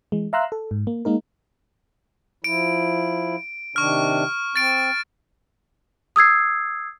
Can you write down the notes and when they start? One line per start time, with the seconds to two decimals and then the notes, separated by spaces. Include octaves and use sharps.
0.12 E3 G#3
0.33 E5 F5 A#5 C6 E6 F#6
0.52 A4
0.71 G#2
0.87 A#3
1.05 G#3 A#3 D#4 A#4
2.44 F3 E4 D7
3.76 C3 D#3 D4 C#6 F6
4.56 C4 A6 D7
6.16 D#6 E6 G#6 C7